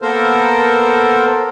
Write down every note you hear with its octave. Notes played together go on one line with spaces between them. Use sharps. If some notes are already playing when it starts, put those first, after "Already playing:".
A#3 B3 A4 A#4 C5